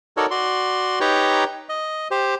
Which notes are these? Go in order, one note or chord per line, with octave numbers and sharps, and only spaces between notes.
D#4 F#4 A4 A#4 C#5 D5
F#4 D5 C6
D#4 G4 B4 C#5 G5 A#5
D#5
G4 C5